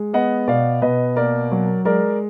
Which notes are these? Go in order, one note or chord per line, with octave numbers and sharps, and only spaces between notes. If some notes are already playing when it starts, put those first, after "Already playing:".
Already playing: G#3
B3 D#5 F#5
B2 D5 F5
B2 B4 D#5
A#3 A#4 D5
F#3
G#3 A#4 D5